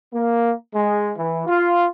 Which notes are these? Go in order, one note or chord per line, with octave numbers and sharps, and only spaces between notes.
A#3
G#3
E3
F4